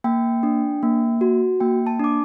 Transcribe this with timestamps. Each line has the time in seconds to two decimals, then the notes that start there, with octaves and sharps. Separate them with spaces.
0.04 A#3 G5
0.43 D4
0.83 A#3
1.21 F#4
1.60 A#3 G5
1.87 A5
2.00 D4 D6